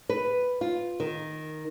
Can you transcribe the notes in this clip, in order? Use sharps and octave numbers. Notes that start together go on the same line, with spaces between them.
B4
F4
D#3